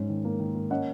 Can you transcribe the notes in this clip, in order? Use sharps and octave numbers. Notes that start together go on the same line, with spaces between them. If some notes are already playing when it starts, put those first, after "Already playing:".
Already playing: G#2 C#4
D#3
A#3
D#3
A#3
C#4 D#5 F#5